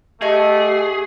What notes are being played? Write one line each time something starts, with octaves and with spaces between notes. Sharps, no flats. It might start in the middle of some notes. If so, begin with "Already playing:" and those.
A3 G4 G#4 D#5 F#5 A#5